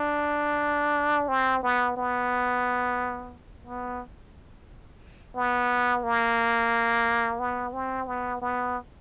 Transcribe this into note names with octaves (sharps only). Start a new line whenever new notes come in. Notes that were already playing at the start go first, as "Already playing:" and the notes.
Already playing: D4
C4
B3
B3
B3
B3
A#3
B3
C4
B3
B3